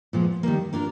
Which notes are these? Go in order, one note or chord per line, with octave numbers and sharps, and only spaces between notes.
A#2 F3 G#3 B3
D#3 G3 A#3
A#3 D4 F4 A#4